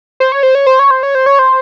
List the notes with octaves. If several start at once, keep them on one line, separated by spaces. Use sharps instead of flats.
C5
C#5
C5
C#5
C5
C#5
C5
C#5
C5
C#5
C5